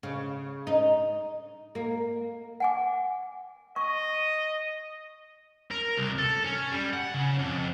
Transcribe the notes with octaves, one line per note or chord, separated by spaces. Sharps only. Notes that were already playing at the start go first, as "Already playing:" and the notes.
C#3
D#4
A#3
F#5 G#5 D6
D#5 C#6
A#4
C2
A4
C#4
G3
F#5
C#3
F2